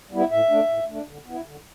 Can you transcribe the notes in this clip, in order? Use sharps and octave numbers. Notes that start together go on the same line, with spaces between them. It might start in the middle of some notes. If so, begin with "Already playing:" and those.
G3 B3 E4
A2 E5
A3 D4
A2
A3 D4
D3
B3 E4
D3